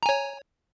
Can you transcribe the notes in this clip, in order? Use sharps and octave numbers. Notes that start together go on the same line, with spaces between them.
C#5 G#5 A#5